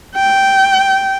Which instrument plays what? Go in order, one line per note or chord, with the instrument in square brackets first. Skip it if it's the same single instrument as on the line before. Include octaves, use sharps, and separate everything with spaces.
[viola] G5